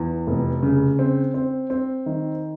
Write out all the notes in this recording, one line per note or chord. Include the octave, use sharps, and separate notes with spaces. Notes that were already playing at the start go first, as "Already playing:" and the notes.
Already playing: E2
F1
C#3
C4
C4
C4
D#3